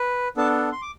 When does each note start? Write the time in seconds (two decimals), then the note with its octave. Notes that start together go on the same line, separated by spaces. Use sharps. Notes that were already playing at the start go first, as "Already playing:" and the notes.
Already playing: B4
0.37 B3 D4 A4 A5
0.72 C6
0.82 D6